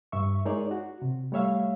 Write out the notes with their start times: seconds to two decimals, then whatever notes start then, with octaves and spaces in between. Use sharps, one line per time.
0.12 G2 E5 C#6
0.45 G#3 D#4 G#4 A#4 C#5 D5
0.71 F#4
1.02 C3
1.32 G3 A3 C#5 E5 F5